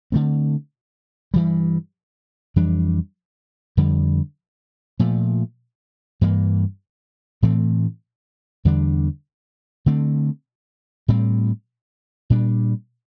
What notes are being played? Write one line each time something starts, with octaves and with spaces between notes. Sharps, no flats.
D3 A3 C4
G2 E3 G3
F2 E3 G3 D4
F2 D3 G3
A#2 F3 A3
G2 E3 A#3
A2 E3 A3 C4
E2 D3 G3 D4
D3 A3 C4
A2 G3 C4
A#2 G3 D4